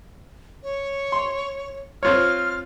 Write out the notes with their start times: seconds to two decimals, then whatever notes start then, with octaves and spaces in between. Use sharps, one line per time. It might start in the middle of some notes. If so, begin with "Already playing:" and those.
0.63 C#5
1.12 C6
2.03 C4 F4 C#5 F6